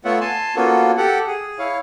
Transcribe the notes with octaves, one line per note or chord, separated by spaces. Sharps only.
A3 B3 F4 C#5 E5 F#5
G#5 A5 C6
A#3 B3 C#4 F4 F#4 A4
G4 A4 F#5
G#4
E4 C#5 F5